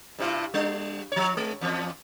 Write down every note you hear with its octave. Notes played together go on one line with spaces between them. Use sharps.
G2 C3 E4
G3 D4
F3 C#5
G#3
E2 F3